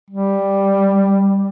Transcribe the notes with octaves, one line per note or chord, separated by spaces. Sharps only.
G3